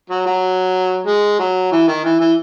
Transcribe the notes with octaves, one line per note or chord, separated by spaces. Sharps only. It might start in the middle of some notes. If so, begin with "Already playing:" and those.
F#3
F#3
G#3
F#3
E3
D#3
E3
E3